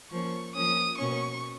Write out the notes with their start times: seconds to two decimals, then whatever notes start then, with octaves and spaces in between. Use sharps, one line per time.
0.11 F3 A#3 C#4 C#6
0.55 F3 A#3 C#4 D#6
0.99 B2 A#3 C#4 C#6